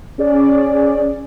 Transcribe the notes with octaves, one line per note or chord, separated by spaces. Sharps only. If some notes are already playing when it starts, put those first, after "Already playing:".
C#4 G#4 D5